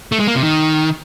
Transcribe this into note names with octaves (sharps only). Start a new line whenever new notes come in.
A3
G#3
A#3
C3
D#3